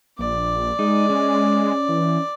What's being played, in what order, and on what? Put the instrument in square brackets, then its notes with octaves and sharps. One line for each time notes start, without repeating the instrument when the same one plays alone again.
[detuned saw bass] A#1 [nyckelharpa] D5
[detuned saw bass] G#3 [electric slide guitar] D#4
[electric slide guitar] C#4
[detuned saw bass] E3